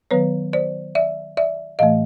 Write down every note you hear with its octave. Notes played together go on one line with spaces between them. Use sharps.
D#3 F#3 B3 B4 C#5
C5 D5
D5 E5
D5 E5
A2 E3 A3 D#5 F5